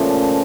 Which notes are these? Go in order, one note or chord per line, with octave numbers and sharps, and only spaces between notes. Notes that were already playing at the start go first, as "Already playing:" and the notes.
Already playing: A#2 C#3 F3 A3 C#4